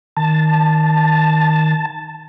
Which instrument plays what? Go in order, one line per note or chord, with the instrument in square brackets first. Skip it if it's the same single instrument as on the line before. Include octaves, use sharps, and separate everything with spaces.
[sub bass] D#3 [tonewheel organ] A5